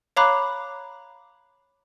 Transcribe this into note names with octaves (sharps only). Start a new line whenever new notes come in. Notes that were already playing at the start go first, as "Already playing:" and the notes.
C#5 F5 A#5 B5 D6 F#6